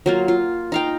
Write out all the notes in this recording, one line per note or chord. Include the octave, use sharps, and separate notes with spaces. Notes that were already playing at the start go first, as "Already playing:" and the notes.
F#3 A#3 F4
F4
D#4 F5 G5